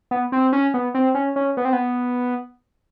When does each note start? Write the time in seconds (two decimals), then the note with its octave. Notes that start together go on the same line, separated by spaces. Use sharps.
0.11 B3
0.32 C4
0.53 C#4
0.74 B3
0.95 C4
1.15 C#4
1.36 C#4
1.57 B3
1.65 C4
1.73 B3